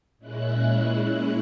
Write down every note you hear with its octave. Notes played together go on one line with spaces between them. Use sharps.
A#2 G#3 C#4 E4 F#6